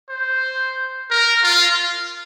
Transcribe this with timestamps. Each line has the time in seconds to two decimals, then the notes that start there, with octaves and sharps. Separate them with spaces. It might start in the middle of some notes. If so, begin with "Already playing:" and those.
0.10 C5
1.10 A#4
1.44 F4